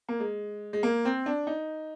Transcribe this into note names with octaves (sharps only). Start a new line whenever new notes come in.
A#3
G#3
G#3
A#3
C4
D4
D#4